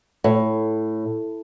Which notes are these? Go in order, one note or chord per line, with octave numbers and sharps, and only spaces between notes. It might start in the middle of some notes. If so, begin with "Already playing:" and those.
A2